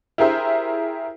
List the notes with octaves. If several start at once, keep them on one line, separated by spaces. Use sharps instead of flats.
E4 G4 G#4 A#4 C5 E5